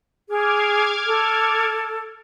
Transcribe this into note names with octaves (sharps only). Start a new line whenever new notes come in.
G#4 D6 F6 G#6
A4